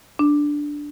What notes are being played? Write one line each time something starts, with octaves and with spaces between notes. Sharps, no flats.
D4